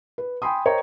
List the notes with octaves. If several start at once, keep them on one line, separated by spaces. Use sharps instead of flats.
B4
G5 G#5 B5 C6 D#6
A#4 C5 C#5 D#5 G5 A#5